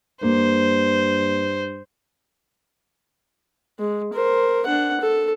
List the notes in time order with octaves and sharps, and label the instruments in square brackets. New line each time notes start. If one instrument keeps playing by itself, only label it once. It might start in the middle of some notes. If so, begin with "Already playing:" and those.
[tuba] G2 [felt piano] A#3 [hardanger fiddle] C5
[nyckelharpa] G#3
A#4 C5
D4 F#5
A4